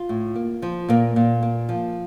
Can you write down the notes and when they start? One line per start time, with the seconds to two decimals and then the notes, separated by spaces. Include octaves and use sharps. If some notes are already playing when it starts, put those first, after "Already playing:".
Already playing: F4
0.09 A2
0.36 A#3
0.62 F3
0.89 A#2 A#3
1.16 A#2
1.42 A#3
1.69 F3